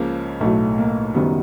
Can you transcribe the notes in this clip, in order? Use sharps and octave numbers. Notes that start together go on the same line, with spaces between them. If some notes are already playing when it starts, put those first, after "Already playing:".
Already playing: C#2 C#3 F3 A#3
B1 A2 F#3 A3
A#3
F#1 F#2 D#3 G3 B3